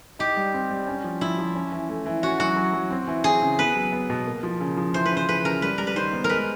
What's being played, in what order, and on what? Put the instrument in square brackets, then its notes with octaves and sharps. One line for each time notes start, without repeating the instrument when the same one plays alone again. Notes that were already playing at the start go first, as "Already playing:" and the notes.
[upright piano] D#4 [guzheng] G4
[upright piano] G3
C4
G3
C#4
F3
[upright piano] F3 [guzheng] E4
[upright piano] F3
C#4
E3
A3
E3
[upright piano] C#4 [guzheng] F#4
[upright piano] F#3 [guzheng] F#4
[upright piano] F#3
F#3
C4
E3
[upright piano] C4 [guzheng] G#4
[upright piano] C#3
[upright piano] B3 [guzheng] B4
[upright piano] F#3
B3
B2
A#3
F3
C#3
F3
[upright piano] E3 [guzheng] C5
[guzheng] B4
[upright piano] C#3
[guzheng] C5
[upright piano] C#3 [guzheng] B4
[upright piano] C#3 [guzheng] A#4
[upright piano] G3 [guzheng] B4
[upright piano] G3 [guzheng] A#4
[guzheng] B4
[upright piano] D#3 [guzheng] C5
[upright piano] B3
[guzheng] A#4
[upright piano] G#3 [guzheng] B4